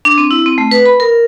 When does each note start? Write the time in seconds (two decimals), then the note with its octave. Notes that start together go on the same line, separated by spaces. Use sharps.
0.05 D4
0.18 C4
0.31 E4
0.46 C4
0.58 A3
0.71 B4
0.86 B5
1.00 A#4